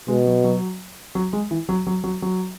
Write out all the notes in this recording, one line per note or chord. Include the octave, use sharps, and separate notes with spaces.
B2 G#3
F#3
F#3
F#3
G#3
E3
F#3
F#3
F#3
F#3